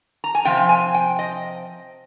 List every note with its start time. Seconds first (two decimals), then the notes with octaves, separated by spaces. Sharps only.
0.24 A#5
0.35 G#5
0.45 C3 F3 C4 G5
0.69 G#5
0.94 G5
1.19 D#5